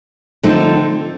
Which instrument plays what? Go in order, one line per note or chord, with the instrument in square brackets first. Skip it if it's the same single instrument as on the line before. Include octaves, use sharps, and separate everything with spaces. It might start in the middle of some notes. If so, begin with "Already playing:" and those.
[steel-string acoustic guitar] D3 F3 A3 C4 D#4